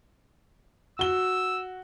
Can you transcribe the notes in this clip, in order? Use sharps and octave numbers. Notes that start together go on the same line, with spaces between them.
F#4 E6 G7